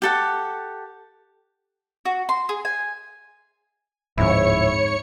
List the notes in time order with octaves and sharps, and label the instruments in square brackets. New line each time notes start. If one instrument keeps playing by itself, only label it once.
[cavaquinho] G4 A4 F#5
[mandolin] F#4
C6
G#4
G#5
[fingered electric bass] D1 F2 [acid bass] G#2 [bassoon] E4 [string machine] C#5 C#7